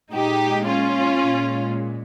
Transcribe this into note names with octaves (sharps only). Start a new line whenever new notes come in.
A#2 G#3 D#4 G4
C#4 F4
A#2 G#3